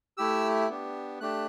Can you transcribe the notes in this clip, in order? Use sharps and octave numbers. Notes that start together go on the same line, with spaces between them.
A3 E4 G4 E6
B3 D4 G4
A3 D4 G4 F#6